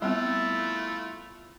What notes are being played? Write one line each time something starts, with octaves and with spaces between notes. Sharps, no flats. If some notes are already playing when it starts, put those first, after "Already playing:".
G3 A3 B3 C4 E4 F4